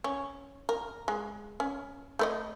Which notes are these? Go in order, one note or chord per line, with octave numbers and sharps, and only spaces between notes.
C#4
A#4
G#3
C#4
A3 B4 D#5